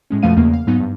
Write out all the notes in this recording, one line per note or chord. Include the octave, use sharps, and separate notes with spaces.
A2 G#3 C#4
F2 B2 F3 A3 F5 D#7
E2 C#3 A#3
F5
G#2 F#3 B3 D#4
G2